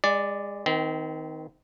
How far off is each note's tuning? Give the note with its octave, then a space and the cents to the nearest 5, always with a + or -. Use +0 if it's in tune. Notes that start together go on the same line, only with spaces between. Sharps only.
G#3 -30 D5 +0
D#3 +15 C4 -30